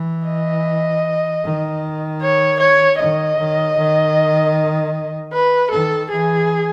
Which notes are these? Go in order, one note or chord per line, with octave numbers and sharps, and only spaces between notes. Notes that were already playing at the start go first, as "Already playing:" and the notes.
Already playing: E3
D#5
D#3
C#5
C#5
D#3 D#5
D#3
D#3
B4
D#3 A4
E3 G#4